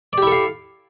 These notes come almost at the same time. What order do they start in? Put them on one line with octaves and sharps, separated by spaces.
D5 G4 E4 A4 F5